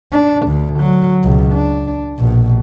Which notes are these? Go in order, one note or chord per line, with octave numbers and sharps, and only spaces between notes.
D4
D2
F#3
C#2 B2
D4
A#1 B2